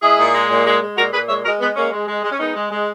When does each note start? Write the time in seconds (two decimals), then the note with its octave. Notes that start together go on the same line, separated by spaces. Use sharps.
0.02 G#3 E4 G#4
0.18 A#2
0.34 G#3
0.50 A#2
0.66 G#3
0.82 G#3
0.97 A#2 F#4 A#4
1.13 A#2 G#4 B4
1.29 G#3 C#5 E5
1.45 G#3 F#4 A#4
1.60 G#3 B3
1.76 G#3 A#3 C#4
1.92 G#3
2.08 G#3
2.24 G#3
2.31 C#4
2.40 G#3 B3 D#4
2.56 G#3
2.71 G#3